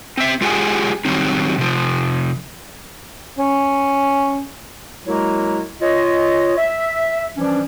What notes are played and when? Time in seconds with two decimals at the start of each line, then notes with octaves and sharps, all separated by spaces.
0.17 C4 E5
0.41 G#3 F4 G4 G#4 F#5 G#5
1.05 D#3 F#3 G3 C4 D#4
1.58 C3 F3
3.38 C#4
5.06 F#3 G#3 A#3 E4 F#4 A#4
5.82 F4 C#5 D#5
6.58 E5
7.37 E3 F3 G3 C#4 D4